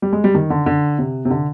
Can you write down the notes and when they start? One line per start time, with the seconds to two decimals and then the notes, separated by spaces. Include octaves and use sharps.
0.02 G3
0.13 G#3
0.24 G3
0.35 D#3
0.50 D3
0.66 D3
0.98 C3
1.25 C3
1.30 D3